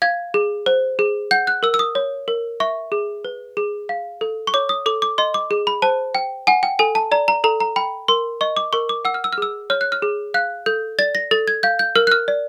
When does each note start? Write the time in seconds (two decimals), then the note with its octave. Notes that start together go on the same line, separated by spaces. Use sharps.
0.02 F5 G#6
0.34 G#4
0.66 C5
0.99 G#4
1.31 F#5 G6
1.47 F#6
1.63 A#4 E6
1.74 E6
1.79 D#6
1.95 C#5
2.28 A#4
2.60 E5 C#6
2.92 G#4
3.25 B4
3.57 G#4
3.89 F5
4.21 A4
4.47 C#6
4.54 C#5 D6
4.69 D#6
4.86 A4 D6
5.02 D6
5.18 D#5 C6
5.34 D6
5.51 G#4
5.67 B5
5.82 C5 A5
6.15 G5
6.47 F#5 G#5
6.63 G5
6.79 A4 G#5
6.95 A5
7.12 D5 A#5
7.28 A#5
7.44 A4 A#5
7.60 A#5
7.76 G5 B5
8.08 A#4 C6
8.41 D#5 C#6
8.57 D6
8.73 A#4 C#6
8.89 D6
9.05 F#5 E6
9.14 F6
9.24 E6
9.33 F6
9.38 G#4 E6
9.70 C#5 F6
9.81 F#6
9.92 F6
10.02 G#4
10.34 F5 F#6
10.66 A4 G6
10.99 D5 A6
11.15 A#6
11.31 A4 A6
11.48 G#6
11.63 F5 G6
11.79 G6
11.95 A#4 F6
12.07 F#6
12.12 F6
12.28 D5